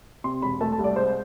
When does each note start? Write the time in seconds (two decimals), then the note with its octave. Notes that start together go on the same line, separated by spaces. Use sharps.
0.24 C3 C6
0.42 E1 B5
0.61 A3 A5
0.72 A5
0.79 C2
0.84 D5
0.96 G#3 C5